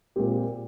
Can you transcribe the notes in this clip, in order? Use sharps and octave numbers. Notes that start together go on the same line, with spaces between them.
A#2 G#3 C4 G4